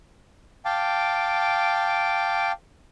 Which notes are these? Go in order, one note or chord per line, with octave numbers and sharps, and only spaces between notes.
F5 G5 A5 D6